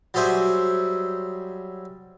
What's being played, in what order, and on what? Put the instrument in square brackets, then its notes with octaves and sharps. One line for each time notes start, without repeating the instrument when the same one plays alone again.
[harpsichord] F#3 G3 G#4 C5 E5